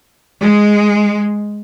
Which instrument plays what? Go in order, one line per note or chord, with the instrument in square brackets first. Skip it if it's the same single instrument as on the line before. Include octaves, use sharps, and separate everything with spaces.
[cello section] G#3